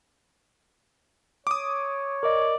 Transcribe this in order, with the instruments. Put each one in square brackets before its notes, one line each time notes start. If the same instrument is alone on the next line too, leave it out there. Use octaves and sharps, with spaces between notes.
[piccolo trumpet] C#5 [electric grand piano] D6 D#6
[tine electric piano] A#4 D#5 [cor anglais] D5